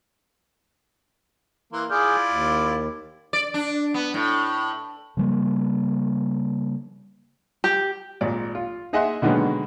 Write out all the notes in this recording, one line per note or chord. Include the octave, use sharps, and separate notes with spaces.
E3 A#3 C6
E4 F4 G#4 D5 F6 G6
D#2
D5
D4
B3
A2
C#3 F3 G3 A#3
G4
G#1 A#2 D5
F4
D#4 G#4 D#5 E5 F#5 C6
B2 D3 D#3 F#3 G#3 B3